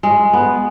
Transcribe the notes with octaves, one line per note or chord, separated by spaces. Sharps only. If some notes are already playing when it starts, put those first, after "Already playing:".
G#3
B3